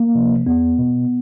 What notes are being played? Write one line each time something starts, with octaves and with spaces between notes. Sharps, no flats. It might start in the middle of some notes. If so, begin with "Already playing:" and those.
Already playing: A#3
C3 F3
E2 B3
B2